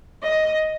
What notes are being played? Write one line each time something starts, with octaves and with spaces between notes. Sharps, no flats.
D#5